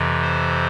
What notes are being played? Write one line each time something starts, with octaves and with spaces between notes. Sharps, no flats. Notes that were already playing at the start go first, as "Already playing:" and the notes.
Already playing: F2 C3 E3
C5